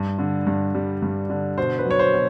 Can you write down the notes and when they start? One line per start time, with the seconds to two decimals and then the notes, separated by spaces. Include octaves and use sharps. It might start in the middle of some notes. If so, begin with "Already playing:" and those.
Already playing: G2
0.19 D3
0.47 G2
0.74 G3
1.02 G2
1.30 D3
1.58 B2 C5
1.78 B4
1.86 F#3 C#5
1.99 C5
2.14 B2